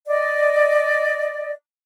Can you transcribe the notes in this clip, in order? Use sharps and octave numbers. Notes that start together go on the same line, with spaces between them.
D5 D#5